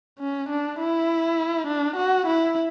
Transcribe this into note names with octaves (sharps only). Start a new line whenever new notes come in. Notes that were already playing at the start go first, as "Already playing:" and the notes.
C#4
D4
E4
D4
F#4
E4